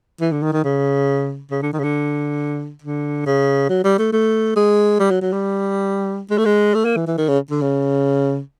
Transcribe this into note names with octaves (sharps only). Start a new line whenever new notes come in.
E3
D3
D#3
D#3
C#3
C#3
D3
D#3
C#3
D3
D3
C#3
F#3
G3
A3
A3
G#3
G3
F#3
F#3
G3
G#3
A3
G#3
A3
A#3
E3
E3
D#3
C#3
D3
C#3